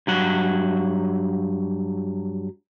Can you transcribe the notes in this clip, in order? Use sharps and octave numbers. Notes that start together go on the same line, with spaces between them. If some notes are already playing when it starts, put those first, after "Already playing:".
G2 F#3 F#5